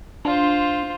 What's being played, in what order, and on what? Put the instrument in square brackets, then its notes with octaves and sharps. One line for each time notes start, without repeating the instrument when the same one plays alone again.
[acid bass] D4 [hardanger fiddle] F4 C5